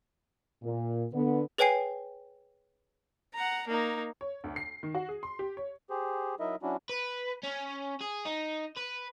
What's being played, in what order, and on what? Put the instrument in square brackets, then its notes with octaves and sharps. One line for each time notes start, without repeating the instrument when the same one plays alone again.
[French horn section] A#2
D3 B3
[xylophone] G#4 B4 C#5 G5 G#5 C7
[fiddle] F#5 A#5
A#3 D#4
[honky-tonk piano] C#5
D2
C7
D#3
F#4
G#4
C6
G4
C#5
[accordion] G4 G#4 C5
F#3 D#4 E4 A#4 D#5 E5
F#3 C#4 D4 E4 F#4
[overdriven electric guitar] B4
C#4
G#4
D#4
B4